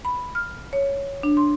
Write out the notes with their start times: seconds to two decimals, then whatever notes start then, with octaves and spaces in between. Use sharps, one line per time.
0.05 B5
0.35 F6
0.73 C#5
1.23 D4
1.37 C6